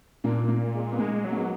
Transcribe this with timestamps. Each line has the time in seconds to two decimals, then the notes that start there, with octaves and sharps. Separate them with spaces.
0.24 A#2 A#3 D4
0.48 A#3
0.75 G#3
0.92 B3
0.99 G#3 A#3
1.24 F#3
1.32 A#3
1.37 G#3 B3